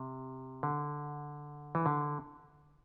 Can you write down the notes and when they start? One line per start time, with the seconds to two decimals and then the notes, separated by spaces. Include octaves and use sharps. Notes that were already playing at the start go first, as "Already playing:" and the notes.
Already playing: C3
0.63 D3
1.75 E3
1.86 D3